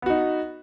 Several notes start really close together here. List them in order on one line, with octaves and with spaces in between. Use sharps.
B3 F#4 D#4